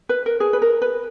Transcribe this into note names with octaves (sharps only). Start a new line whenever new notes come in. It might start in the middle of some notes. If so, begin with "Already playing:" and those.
B4
A#4
G#4
B4
A#4
B4